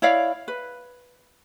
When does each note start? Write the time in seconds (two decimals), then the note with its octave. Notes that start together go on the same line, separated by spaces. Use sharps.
0.02 E4 C#5 D5 F5
0.48 B4